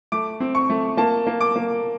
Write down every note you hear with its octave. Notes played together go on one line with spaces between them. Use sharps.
A3 D6
C4
C#6
A3
A#3 A5
A#3
D6
A#3